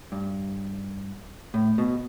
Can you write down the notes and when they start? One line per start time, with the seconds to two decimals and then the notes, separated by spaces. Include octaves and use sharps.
0.12 G2
1.54 A2
1.78 B2